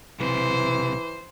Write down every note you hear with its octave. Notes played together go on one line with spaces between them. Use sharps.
B1 C3 E3 C5